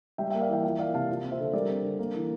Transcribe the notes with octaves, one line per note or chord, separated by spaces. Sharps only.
G3 E5 G5
A#3 E5 G5
D5 F5
E3 E5 G5
F3 E5 G5
A#3 D5 F5
C3 F5 A5
F3
C4
C5 E5
D3
G3 A#4 D5
C4
D3
A#3
E3